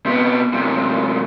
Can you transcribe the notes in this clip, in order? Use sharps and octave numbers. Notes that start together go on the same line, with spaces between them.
C3 B3
F#2 C3